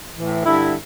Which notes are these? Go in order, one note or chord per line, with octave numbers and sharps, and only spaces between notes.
A2 E3
G2 D3 E4